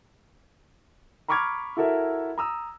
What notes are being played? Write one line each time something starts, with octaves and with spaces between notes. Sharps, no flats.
A#5 B5 C#6 D6 F6 G#6
E4 F#4 A4 A#4 E5
A#5 D#6 E6